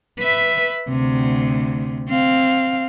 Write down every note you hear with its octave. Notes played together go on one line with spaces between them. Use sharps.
B4 E5
D2 C3
C4 F5